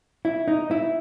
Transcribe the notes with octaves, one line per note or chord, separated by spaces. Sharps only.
E4
D#4
E4